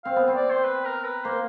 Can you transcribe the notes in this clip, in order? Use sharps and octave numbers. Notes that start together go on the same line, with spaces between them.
C4 F5
B3
C4
D5
C5
B4
A#4
B4
A#3 C5